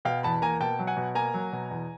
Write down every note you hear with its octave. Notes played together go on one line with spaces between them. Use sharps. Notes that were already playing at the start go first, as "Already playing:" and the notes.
B2 F5 G5
E2 A5 B5
A#3 G#5 A#5
B2 G5 A5
F#3
F#5 G#5
B2
A#3 G#5 A#5
F#3
B2
E2